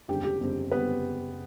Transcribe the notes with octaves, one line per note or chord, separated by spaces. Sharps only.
F#1 E2 D3 G3 C4 G4 G5
G4 G5
F#1 E2 D3 G3 C4
D3 G3 B3 C4 B4